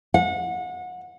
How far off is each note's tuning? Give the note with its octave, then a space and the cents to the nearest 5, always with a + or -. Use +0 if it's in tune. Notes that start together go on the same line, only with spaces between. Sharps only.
F#5 -30